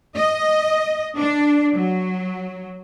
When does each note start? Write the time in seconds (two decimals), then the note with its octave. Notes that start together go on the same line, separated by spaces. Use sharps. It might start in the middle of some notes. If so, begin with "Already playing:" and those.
0.16 D#5
1.17 D4
1.74 F#3